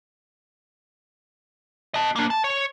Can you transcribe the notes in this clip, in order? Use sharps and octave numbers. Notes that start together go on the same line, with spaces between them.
D#5 A5
A#3 D4
A5
C#5